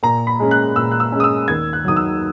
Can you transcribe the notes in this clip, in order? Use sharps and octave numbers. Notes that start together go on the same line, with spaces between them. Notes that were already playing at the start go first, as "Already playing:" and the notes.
A#2 A#5
B5
G#3 C#4
F#6
A#2 E6
F#6
E6
G#3 C#4
D#6
E6
D#2 G#6
F#6
D#3 F#3 D#6
E6